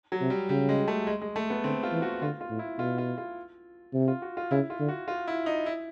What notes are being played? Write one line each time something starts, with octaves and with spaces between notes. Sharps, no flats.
F#3
C3
G3
C#3 G3
G#3
A3
G#3
G#3
A3
B3
D3 C4
F4
E3
F#4
D3 F4
F4
A2
E4
B2 F4
F4
F4
C3
F4
F#4
F4
C#3 E4
F4
D3
F#4
F4
E4
D#4
E4